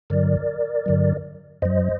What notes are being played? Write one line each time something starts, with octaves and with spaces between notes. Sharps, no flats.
G2 D3 F#3 A#4 D5
G2 D3 F#3
F#2 F#3 C5 D#5